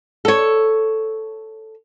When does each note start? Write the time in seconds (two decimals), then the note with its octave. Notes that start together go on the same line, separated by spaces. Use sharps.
0.25 A4 C#5